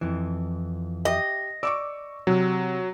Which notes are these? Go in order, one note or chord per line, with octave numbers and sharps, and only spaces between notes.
F2 E3
G4 D#5
D5 C#6 D6 E6
C3 F#3